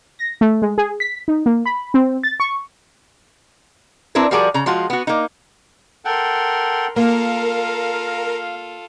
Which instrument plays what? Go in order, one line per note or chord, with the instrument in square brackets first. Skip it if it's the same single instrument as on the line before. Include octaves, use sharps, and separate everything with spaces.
[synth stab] A#6
A3
G#3
G#4
B6
D#4
A#3
B5
C4
A6
C#6
[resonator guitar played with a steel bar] C4 D4 E4 A#4 B4
F3 G3 F#4 G#4 A#4 D5
C#3 A#5
F3 G#3 F4 F#4
B3 F#4
A#3 D#4
[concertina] A4 F#5 G5 [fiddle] A#4 C6
[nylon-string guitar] A#3 [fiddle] F4 A4 [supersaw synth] A#4 [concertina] F5